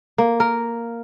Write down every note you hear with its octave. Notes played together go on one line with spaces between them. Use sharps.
A#3
A#4